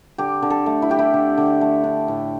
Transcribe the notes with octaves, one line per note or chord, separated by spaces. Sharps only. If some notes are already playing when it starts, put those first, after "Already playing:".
D3 G4
D3
A4
A3
E4
D4 G4
E4
D3
D3
A3
D4
A2